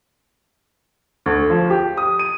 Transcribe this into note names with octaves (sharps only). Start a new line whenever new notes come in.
D2
F3
G4
D#6
D#7